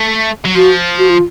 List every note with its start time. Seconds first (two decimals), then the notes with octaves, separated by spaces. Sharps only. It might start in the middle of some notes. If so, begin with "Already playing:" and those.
Already playing: A3
0.45 F#3
0.55 F3 F#4
0.98 F#4
1.10 F4